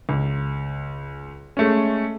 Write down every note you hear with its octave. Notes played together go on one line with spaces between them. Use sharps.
C#2
G#3 A3 C#4